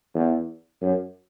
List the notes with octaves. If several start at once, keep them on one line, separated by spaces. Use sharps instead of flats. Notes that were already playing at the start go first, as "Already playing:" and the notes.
E2
F#2